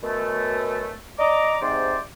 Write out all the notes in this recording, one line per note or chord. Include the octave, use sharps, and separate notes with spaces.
F#2 B2 A3
D5 D#5 A#5 D6
G#2 C3 C5 D5